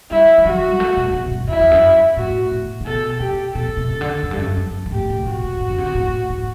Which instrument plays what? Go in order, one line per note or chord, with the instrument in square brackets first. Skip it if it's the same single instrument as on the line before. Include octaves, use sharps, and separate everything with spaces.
[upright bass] G3 [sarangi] E4
[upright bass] E3
[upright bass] F#3 [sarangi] F#4
[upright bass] G3
A3
B2
B2
G2
[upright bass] E2 [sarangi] E4
[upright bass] E2
F#2
[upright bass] A2 [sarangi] F#4
[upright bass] A2
C3
[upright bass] B2 [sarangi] A4
[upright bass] C3 [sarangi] G4
[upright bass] B2 [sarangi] A4
[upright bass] C3
C3
D3
F#2
G2
F#2
F#2
G2
[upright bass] A2 [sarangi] G4
[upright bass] C3
[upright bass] A2 [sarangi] F#4
[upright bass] A2
F#2
D3
C3
B2
A2
A2